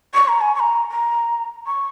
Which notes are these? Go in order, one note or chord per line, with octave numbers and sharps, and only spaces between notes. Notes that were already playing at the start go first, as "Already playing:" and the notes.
C#6
A#5
G#5
C#6
A#5
A#5
C#6